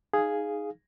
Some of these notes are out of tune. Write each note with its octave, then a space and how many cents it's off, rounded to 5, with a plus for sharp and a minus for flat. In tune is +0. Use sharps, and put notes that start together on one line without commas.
D#4 +0 G#4 +0 F5 +0